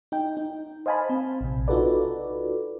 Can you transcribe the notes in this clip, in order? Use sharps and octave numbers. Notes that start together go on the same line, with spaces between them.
D#4 G5
D#4
C5 D#5 F5 G#5 A5 B5
C4
A#1 C3
D#4 F4 F#4 A4 B4 D5